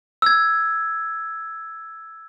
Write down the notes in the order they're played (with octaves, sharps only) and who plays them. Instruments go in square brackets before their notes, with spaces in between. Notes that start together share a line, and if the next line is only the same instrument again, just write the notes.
[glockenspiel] E6 G#6